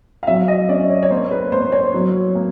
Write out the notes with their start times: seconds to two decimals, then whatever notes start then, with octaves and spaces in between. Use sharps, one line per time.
0.23 F5
0.27 F#3 E5
0.48 D#5
0.69 C#4 D5
0.90 C#5
1.03 C#5
1.10 A#3 C5
1.31 B4
1.52 A#3 C5
1.72 C#5
1.94 F#3
2.35 A#3